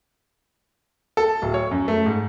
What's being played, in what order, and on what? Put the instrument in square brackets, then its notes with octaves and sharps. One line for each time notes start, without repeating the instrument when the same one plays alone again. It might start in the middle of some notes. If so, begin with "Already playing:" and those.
[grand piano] A4
D1
C#5
F#2
A3
G#2